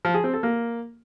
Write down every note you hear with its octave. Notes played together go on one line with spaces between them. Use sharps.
F3
G#4
C4
A4
A#3